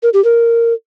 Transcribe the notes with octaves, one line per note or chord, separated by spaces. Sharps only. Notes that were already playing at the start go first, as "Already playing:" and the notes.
A#4
G4
A#4